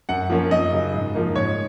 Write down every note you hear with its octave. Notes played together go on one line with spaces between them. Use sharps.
F#2 F#5
F3 A#3 C#4
F#2 D#5
C#3 F#3
G#2
F3 A#3 D#4
G#2 C#5